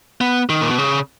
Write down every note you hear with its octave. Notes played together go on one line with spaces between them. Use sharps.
B3
D#3
A#2
B2
C#3